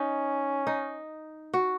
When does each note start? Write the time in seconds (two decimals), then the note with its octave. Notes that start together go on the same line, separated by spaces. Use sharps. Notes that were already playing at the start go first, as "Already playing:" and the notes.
Already playing: C#4 D#4
0.67 D#4
1.54 F#4